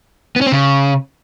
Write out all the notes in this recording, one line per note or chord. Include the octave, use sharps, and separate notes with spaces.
B3
C#4
C4
C#3